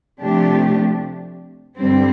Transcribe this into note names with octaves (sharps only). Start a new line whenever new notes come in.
C3 F3 A3 D4 G4
G2 D3 G3 C4